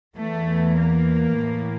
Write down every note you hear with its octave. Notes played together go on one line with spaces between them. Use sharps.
E2 E3 A3
A#3
A2 E3